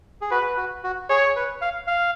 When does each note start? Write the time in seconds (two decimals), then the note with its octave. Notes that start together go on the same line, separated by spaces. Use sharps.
0.21 G#4
0.31 F#4 B4
0.57 F#4
0.84 F#4
1.09 G#4 C#5
1.36 B4
1.61 F5
1.87 F5